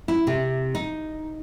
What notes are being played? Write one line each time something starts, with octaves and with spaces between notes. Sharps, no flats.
E4
C3
D#4